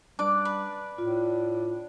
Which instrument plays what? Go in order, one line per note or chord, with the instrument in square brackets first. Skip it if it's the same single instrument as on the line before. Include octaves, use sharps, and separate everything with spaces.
[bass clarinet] G3 [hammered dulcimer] D4 D5 [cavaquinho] D6
[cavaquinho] B4
[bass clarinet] A2 [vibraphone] F4